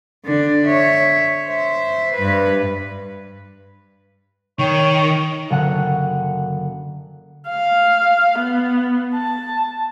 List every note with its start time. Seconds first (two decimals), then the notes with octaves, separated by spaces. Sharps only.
0.25 D3 D4
0.66 C#5 E5
1.47 C5 E5
2.14 G2 B4
4.59 D#3 C#5 G5 C#6
5.50 F#1 D3 F#5 F#6
7.49 F5
8.39 B3
9.15 A5